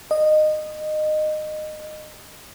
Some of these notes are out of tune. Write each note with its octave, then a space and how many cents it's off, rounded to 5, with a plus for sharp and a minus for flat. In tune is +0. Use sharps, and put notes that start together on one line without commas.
D#5 -20